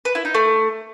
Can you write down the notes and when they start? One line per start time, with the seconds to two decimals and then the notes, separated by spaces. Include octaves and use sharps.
0.05 B4
0.15 E4
0.25 D#4
0.35 A3